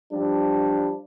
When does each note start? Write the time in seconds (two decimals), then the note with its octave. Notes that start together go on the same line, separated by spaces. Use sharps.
0.12 F3 G3 D4